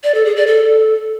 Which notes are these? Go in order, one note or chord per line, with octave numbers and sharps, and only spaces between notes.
D5
A4
G#4
D5
A4